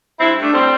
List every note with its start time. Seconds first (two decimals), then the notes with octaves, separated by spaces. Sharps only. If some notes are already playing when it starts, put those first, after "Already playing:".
0.20 G2 C4 E4
0.37 G2
0.42 A3 D4
0.53 A2 G3 C4